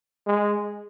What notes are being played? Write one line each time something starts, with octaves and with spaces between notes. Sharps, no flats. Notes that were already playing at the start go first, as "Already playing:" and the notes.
G#3